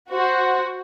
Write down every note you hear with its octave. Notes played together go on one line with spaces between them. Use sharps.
F#4 C5